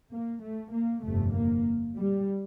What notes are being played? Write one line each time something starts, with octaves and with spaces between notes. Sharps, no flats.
A#3
A3
A#3
G1 F2 C3 A3
A#3
G3